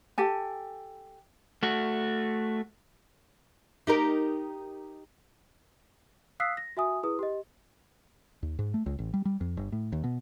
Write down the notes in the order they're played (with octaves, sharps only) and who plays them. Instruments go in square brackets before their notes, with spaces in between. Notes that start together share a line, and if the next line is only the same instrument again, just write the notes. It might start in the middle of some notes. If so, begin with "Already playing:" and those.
[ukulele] G4 A4 G#5
[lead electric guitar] A3 F#4
[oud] D#4 G4 A#4
[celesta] F5 D#6 E6 F#6 B6 C7
A#6
F#4 E5 G#5 D#6
E4 G#4 B4 D#6
G4 D#5
[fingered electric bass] D#2
G#2
A3
C#2
A1
G3
G3
F2
G1
A2
D#2
B2